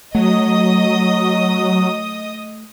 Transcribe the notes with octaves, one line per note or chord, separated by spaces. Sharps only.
F#3 A3 D#5 D#6